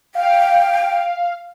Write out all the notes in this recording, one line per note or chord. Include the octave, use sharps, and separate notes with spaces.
F5 G5